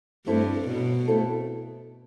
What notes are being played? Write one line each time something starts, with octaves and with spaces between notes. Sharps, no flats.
G2 A3 C4 E4 A4
B2 F#3
A3 C4 E4 A4